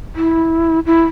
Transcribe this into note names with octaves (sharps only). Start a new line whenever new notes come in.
E4
E4